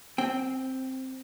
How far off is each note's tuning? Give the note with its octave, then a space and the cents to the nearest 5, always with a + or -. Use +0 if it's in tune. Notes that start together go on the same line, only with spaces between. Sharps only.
C4 +0 G5 +0